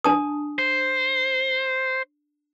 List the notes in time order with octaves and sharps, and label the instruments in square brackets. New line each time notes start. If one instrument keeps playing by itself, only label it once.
[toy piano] D4 A5 D#6
[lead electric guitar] C5